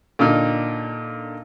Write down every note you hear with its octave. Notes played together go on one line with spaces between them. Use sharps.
A#2 D3 D#4 F6